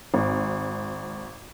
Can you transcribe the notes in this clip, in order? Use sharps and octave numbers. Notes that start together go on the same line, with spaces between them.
G#1